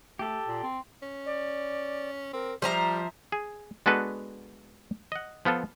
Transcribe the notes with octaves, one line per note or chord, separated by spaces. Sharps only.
A3 G4 A4
A#2
C4
C#4
D5
C4 A#4
F3 G3 C5 E5 A#5
G#4
G#3 B3 D4 F#4 A4 B4
D#5 F#5
F3 B3 F4 A4